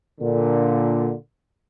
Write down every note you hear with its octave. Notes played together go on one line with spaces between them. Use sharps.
A#2 D3